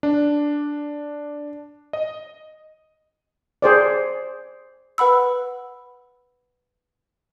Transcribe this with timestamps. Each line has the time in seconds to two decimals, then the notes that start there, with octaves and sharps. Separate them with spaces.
0.03 D4
1.93 D#5
3.62 G#4 C5 D5
4.98 B4 F#5 B5 E6